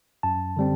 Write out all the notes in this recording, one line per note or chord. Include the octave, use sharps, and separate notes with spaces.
F#2 A5
D3 G3 C4